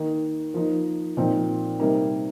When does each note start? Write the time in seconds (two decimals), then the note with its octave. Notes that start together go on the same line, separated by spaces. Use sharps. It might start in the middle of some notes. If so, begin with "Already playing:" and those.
Already playing: D#3 A#3 D#4
0.54 F3 A#3 D#4
1.17 A#2 F3 C4 D#4
1.80 C3 G3 A#3 D#4